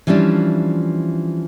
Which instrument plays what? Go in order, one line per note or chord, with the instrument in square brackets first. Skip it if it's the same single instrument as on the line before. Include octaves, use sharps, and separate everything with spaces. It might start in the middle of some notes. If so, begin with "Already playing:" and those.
[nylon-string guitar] E3 F3 G3 C#4 D4 F4